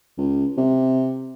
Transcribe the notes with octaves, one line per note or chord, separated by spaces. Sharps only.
C#2
C3